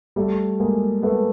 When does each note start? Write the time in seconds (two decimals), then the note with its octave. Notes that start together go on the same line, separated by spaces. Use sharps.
0.16 G3 A3
0.60 G#3 A#3
1.02 A3 B3